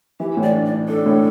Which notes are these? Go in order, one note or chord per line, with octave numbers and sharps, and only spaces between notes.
E3 G4
A2
D5
D4
D5
D4
D4 A4
A2